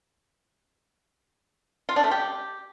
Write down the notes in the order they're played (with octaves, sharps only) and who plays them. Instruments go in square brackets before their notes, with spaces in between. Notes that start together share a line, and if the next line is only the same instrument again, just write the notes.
[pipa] F4
D4
A3
G4